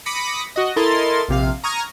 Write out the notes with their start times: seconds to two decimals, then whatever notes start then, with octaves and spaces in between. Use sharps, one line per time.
0.06 B5 D6 D#6 A#6 B6 C#7
0.56 F#4 D#5
0.76 E4 A4 A#4 D#5 C6 A6
1.28 A#1 C3 F5
1.64 A#5 C#6 D#6 F6 G#6 A#6